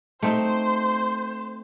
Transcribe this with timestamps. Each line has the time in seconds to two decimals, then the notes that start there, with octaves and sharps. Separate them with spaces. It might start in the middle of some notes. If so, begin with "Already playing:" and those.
0.23 A3 C4 D#4 C5